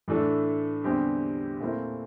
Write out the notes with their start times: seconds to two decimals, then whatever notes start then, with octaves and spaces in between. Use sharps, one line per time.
0.08 A2 E3 A3 D4 A4
0.84 E2 D3 G3 C4 G4
1.60 A#2 A3 C4 E4 A#4